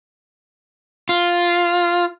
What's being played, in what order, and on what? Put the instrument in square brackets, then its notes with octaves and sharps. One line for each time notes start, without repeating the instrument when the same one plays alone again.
[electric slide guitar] F4